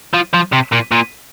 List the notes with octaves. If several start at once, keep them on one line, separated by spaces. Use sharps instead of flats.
F3
F3
C3
A#2
A#2